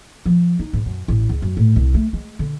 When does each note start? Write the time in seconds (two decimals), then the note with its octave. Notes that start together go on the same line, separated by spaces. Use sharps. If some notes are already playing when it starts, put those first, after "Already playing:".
0.26 F3
0.59 D#4
0.73 G#2
0.86 F#2
1.08 A1
1.29 C#2
1.42 F#2
1.57 A2
1.76 C2
1.94 A3
2.13 G#3
2.39 D3